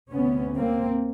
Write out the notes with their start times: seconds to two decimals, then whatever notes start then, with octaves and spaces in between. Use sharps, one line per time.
0.11 D2 C3 B3 C#4
0.54 A#3 C4